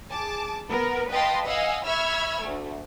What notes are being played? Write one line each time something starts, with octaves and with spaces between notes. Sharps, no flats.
G#4 A5 D6
B3 A#4 B4
B4 D#5 F5 G5 A5 C6
D#5 F5 F#5 G#5 E6
E5 B5 C#6 E6 F6 G#6
D2 A3